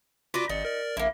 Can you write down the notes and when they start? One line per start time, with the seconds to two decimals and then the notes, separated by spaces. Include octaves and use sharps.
0.34 F4 F#4 B4 D5 A#5 D6
0.49 G#1 D#4 D5
0.65 A#4 D5
0.97 A#1 A#3 E4